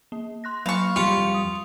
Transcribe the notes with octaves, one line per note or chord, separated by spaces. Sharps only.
A#3
C6 F#6 A#6
F#3 A#3 F5 B5 C#6
F2 G3 F4 G4 C#7
D#6